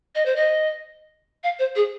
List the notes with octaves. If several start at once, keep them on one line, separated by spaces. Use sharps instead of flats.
D#5
C5
D#5
F5
C5
G#4